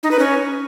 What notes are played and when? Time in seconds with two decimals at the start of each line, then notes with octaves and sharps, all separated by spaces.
0.03 D#4
0.11 B4
0.19 C#4